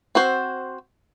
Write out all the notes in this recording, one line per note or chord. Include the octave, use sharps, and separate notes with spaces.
C4 F#4 C5